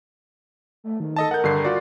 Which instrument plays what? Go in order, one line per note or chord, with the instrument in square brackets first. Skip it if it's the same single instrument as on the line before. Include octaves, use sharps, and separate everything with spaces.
[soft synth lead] A3
D#3
[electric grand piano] A4 D#5 A5
[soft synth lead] A#4 [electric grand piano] F#5 G6
[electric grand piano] G2 D3 C7
F4 F#4 D5